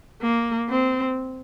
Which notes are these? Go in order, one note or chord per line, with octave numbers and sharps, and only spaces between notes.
A#3
C4